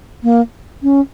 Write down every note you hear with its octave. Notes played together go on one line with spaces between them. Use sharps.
A#3
C#4